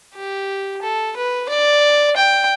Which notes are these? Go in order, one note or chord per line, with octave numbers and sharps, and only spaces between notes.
G4
A4
B4
D5
G5